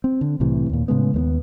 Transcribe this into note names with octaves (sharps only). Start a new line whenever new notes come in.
C4
D3
C2 A2 C3 E3
D#2 A#2
A2 C#3 G#3 B3
D#2 A3 B3